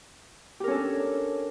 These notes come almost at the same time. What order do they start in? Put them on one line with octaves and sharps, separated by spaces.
G4 A#4 C#4 A4 D4